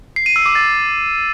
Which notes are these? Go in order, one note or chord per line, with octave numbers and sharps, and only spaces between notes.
C7
D#7
E6
D6
A6